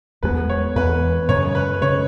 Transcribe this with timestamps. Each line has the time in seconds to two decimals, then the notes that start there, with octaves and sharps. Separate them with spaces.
0.23 E2 E3 G#3 B3 B4
0.50 C#5
0.75 E2 E3 G#3 B3 B4
1.28 F#2 C#3 G#3 C#5
1.55 B4
1.81 C#3 G#3 C#5